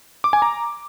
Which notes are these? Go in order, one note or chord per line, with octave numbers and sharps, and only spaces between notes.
D6
G#5
A#5